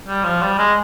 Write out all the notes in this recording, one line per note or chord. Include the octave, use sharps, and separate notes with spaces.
G3
F3
G3
G#3